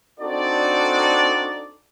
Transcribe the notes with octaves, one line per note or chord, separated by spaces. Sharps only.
C4 D4 D#4 F#4 A4 D5